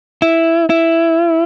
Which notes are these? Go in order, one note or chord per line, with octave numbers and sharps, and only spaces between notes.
E4
E4